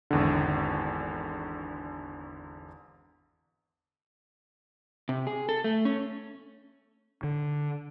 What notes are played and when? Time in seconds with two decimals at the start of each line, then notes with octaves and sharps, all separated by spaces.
0.11 G#1 E2 D3
5.09 C3
5.27 G#4
5.49 A4
5.64 A3
5.85 C#4
7.23 D3